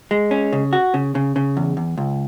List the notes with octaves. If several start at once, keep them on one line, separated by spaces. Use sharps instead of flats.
G#3
C#4
C#3
F#4
C#3
C#3
C#3
E2
E2
C#2